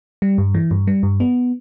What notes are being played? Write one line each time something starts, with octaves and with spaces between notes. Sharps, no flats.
G3
G2
E3
G2
G3
G2
B3